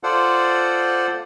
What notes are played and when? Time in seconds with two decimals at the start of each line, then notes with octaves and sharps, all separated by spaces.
0.03 F4 A4 C5 D5 F#5